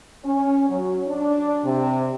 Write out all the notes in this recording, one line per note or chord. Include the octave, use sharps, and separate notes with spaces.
C#4
F#3
D4
C3